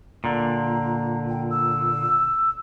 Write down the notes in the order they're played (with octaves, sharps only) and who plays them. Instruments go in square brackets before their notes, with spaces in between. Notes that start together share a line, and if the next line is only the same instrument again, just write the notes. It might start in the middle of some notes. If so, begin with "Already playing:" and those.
[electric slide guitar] A#2 D3 [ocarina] A#5
[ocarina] G5
E6